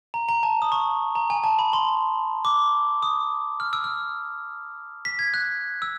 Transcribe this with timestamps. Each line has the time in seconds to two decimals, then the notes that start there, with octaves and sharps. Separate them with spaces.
0.14 A#5
0.29 A#5
0.43 A5
0.62 D#6
0.72 C#6
1.15 A#5
1.30 G#5
1.44 A5
1.59 B5
1.73 C6
2.45 D6
3.03 D#6
3.60 F6
3.73 E6
3.84 F6
5.05 B6
5.19 G#6
5.34 F#6
5.82 E6